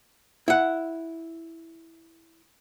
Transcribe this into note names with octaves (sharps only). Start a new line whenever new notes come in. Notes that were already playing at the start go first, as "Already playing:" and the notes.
E4 F#5